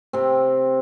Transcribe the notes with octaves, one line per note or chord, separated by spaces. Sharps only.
C3 C4